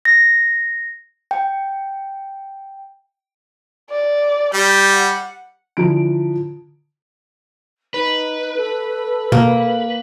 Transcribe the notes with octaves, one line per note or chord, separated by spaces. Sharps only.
A#6
G5
D5
G3 G6
F#5
D3 E3 F3 A#5 D7
D#4 B4
A4
B2 A#3